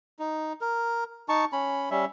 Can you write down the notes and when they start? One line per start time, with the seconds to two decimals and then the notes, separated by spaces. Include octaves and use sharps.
0.19 D#4
0.61 A#4
1.29 D#4 A5 C#6
1.53 C#4 B5
1.91 G3 C#4 E5